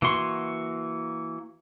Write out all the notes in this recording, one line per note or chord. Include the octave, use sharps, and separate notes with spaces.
E3 A#3 F#4 C6 C#6